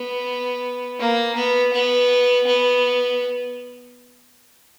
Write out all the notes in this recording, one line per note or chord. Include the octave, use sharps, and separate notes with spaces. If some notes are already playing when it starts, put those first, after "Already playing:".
Already playing: B3
A#3
B3
B3
B3